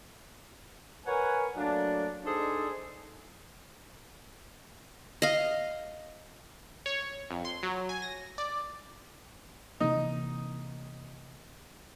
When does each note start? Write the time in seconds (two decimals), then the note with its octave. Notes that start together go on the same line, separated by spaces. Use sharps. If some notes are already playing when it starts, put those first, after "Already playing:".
1.05 A#4 B4 C#5 F#5 G#5
1.57 F#3 A3 A#3 D4
2.24 D4 D#4 G#4 A4 C5 D5
5.22 D#5 F5
6.86 C#5
7.31 F2
7.45 C6
7.63 F#3
7.89 G#5
8.02 A#6
8.38 D5
9.80 C3 E3 A#3 D#4